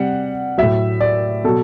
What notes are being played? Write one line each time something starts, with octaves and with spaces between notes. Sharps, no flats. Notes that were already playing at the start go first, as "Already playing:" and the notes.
Already playing: C3 G3 F#5
A2 F#3 E5
D5
B2 F#3 A4